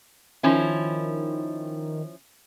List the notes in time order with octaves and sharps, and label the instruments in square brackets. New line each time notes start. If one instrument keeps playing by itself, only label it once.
[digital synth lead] D#3 [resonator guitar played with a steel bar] F3 C#4 E4